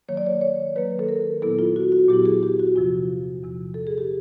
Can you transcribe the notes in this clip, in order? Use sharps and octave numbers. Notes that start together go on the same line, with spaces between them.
D#3 F#3 A#3 C#5
D5
C#5
C#5
D#3 F#3 A#3 B4
A4
A#4
A#2 F#3 B3 E4 A4
F4
F#4
F#4
A#2 F#3 B3 E4 G4
G#4
G4
F#4
E2 C3 F3 F4
E2 C3 F3
A4
G#4
G4